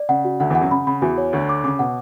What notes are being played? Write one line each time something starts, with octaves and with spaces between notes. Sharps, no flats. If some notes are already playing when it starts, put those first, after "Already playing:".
Already playing: D5
C#3 F#5
F#4
D2 D3 F#5
E2 E3 F#5
F#2 F#3
C#3 B5
C#3 B5
E2 E3 F#4
C#5
D2 D3 F#5
D6
C#3 D6
B2 F#5